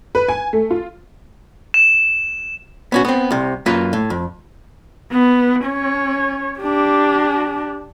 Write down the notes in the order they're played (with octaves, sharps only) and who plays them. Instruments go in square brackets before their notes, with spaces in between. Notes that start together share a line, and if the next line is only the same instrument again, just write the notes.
[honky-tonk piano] B4
G#5
A3
F4
[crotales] E7
[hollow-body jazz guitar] B3 C#4 F#4
B3 C4
C2 C3
F#2 A#3 F4 B4
A2
F2
[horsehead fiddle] B3
C#4 C#5
D4 G4